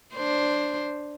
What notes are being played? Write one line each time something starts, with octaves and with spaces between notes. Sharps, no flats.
D4 C5